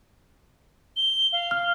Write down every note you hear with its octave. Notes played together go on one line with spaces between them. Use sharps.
G7
F5
F6